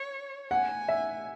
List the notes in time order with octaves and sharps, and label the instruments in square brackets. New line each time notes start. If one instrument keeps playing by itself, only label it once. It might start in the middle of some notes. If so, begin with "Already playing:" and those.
Already playing: [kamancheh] C#5
[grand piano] F#5 [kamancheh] G#5
[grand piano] E5